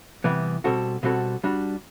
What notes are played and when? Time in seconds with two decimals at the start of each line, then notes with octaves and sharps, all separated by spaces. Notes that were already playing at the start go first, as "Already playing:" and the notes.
0.24 C3 E3 G3 B3
0.64 B2 G3 C4 F#4 A4
1.03 B2 G3 C4 F#4 A4
1.44 G3 D4 F#4